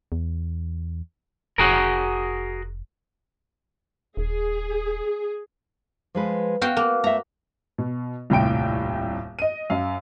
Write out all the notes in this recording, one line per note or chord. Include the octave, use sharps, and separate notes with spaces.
E2
F1 F#4 G#4 A#4
D#1 G#4
F3 G#3 B4
B3 F#4 F5 G5
A#3
A3 E5 A#5
B2
D#1 C2 A2 G5 D7
D#5 D#7
F#2 F5